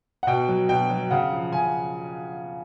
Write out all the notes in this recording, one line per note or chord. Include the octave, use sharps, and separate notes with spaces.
F#5
B2 G5
F#3
B2 G5
F#3
C#3 F#5
F3
C#3 G#5